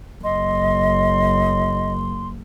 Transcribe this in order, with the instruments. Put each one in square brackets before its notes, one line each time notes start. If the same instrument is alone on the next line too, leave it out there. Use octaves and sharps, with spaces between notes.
[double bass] F#1 [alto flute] D#5 [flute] C6